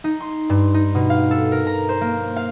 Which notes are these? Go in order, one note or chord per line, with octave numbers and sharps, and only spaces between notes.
D#4
C6
G2
D#4
B2
F5
A4
A#4
A#5
C5
A#3
F5